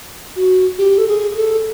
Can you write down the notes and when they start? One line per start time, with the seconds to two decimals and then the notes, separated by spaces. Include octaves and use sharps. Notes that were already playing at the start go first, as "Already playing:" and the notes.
0.36 F#4
0.78 G4
0.98 A4
1.08 G#4
1.36 A4